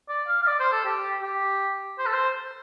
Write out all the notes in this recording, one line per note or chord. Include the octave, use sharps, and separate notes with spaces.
D5
F5
F5
D5
C5
A4
G4
G4
C5
A4
C5